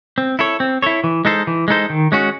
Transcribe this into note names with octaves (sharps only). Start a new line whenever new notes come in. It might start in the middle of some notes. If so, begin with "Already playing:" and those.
C4
E4 A4 C#5
C4
E4 A4 C#5
E3
G#3 D#4 A4 C5
E3
G#3 D#4 A4 C5
D#3
G#3 C#4 F#4